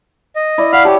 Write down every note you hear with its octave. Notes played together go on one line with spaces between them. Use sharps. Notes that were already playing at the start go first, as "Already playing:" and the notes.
D#5
E4 D5
F5 F#5 B5 F6
G4 C#5 A5